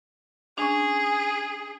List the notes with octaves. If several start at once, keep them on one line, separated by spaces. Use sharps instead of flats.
C#4 D4 G#4